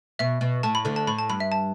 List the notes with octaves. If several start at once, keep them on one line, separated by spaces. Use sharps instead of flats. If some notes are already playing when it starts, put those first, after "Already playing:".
B2 E5
B2
A2 A5
B5
D2 D3
A5
A2 B5
A5
G2 B5
E5
A5